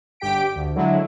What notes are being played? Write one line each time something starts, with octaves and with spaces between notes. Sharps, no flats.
G1 G4 G5 B6 D7
D2
D3 F#3 G#3 E4